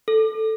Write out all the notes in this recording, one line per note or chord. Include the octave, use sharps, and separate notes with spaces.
A4